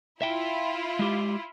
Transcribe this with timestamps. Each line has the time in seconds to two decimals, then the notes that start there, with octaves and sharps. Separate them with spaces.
0.22 E4 F4 E5 G5
0.99 G#3 G4